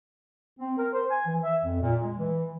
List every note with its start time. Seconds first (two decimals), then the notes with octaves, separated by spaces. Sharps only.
0.59 C4
0.78 A#4
0.93 C5
1.10 G#5
1.26 E3
1.43 E5
1.64 F2
1.81 A#2
2.02 G#3
2.18 E3